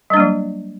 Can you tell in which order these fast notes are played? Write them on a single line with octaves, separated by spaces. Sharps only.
G3 D4 A#3 F#3